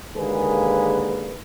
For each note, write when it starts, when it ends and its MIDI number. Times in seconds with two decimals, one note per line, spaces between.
0.17 1.36 39
0.17 1.36 50
0.17 1.36 56
0.17 1.36 58
0.17 1.36 68
0.17 1.36 71